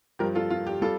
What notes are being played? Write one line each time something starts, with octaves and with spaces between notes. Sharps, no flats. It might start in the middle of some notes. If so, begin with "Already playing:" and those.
G2 F3 G4 A#4
F4 A4
F4
G4
G3 F4 A4